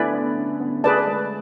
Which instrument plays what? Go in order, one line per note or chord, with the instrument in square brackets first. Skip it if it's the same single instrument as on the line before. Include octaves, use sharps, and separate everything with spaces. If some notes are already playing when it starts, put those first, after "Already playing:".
Already playing: [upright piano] D3 A3 B3 [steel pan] E4 B4 D5 G#5 B5
[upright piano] B3
C#4
B3
[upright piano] A3 [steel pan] G#4 B4 D5 A5
[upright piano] G#3